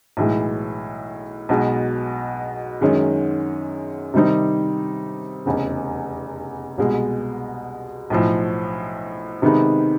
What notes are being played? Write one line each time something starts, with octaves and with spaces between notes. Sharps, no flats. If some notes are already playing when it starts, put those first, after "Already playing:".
B1 A2 E3 G#3
B1 B2 G#3
F#2 D#3 G#3 C#4
C3 D#3 G3 C4 D#4
F1 E2 C#3
C2 B2 G#3
B1 A2 F3
C3 D#3 G#3 B3 D#4